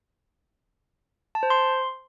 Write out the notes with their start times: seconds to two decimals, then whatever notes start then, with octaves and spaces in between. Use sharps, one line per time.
1.35 A5
1.43 C5
1.50 C6